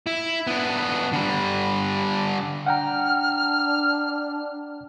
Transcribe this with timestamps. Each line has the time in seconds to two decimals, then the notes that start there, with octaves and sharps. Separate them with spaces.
0.07 E4
0.47 B3 D4
1.12 D3 G3
2.66 D4 F#5 G5 A#5 F6